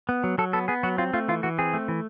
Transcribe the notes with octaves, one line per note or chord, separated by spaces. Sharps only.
B3
F#3
F#3 A4
B3 A4
B3 G#4
F#3 F#4
C4 F4
A3 F4
E3 F4
E3 F#4
C4 G#4
A3
E3